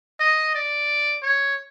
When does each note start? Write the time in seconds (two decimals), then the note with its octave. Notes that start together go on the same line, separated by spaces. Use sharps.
0.20 D#5
0.55 D5
1.23 C#5